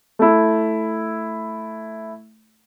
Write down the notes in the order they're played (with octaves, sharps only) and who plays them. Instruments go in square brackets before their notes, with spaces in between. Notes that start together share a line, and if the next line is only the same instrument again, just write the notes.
[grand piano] A3 E4